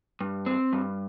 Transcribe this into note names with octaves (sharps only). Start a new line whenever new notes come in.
G2
C4
G2